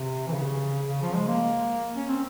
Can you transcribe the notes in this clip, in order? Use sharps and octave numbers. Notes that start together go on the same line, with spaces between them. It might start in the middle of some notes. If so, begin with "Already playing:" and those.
Already playing: C3
E3
C#3
C#3
F3
G#3
A#3
C#4
C4